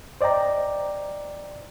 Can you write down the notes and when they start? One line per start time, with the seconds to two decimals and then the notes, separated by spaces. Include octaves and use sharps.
0.21 C5 D5 D#5 G5 A#5